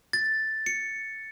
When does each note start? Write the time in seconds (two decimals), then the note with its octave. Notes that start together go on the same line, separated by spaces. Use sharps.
0.13 A6
0.66 C#7